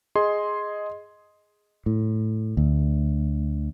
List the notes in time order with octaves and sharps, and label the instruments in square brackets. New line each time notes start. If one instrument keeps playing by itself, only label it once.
[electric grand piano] G#4 D#5 C6
[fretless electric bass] A2
D2